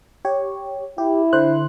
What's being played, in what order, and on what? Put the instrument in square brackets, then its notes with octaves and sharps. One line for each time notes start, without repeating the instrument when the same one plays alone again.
[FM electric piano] G4 C#5
[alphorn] E4 [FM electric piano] G4
[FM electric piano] D3 C5 F#6